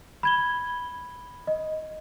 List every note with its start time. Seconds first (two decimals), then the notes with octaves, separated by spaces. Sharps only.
0.23 B5 G#6 G7
1.47 D#5